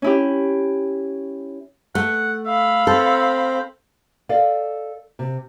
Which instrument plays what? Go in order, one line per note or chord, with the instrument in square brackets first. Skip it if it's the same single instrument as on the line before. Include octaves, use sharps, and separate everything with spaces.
[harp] C#4 E4 G4
[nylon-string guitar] A3 [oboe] F#5
[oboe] E5 [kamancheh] F5 B5
[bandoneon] C4 C5 [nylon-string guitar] A4
[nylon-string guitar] A4 D5 D#5 F5
C3